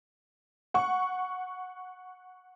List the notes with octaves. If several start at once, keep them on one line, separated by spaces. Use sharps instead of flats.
F#5 C#6